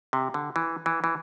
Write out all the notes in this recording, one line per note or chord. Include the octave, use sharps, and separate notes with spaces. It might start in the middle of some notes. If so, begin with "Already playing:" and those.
C3
D3
E3
E3
E3